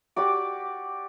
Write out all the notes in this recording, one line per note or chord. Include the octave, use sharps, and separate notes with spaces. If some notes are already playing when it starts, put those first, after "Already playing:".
F#4 G4 D5 D6